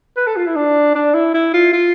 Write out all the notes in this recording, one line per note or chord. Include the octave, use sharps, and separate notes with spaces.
B4
A4
F4
E4
D4
D4
E4
E4
F4
F4